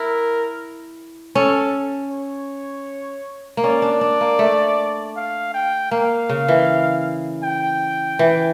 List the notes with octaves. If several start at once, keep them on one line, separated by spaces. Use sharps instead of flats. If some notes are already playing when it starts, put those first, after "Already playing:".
Already playing: E4 A#4
C#4 A4
C#5
A#3
C#4 D5
D4
D4
A#3
A3
F5
G5
A#3 F5
C#3
E3
G5
E3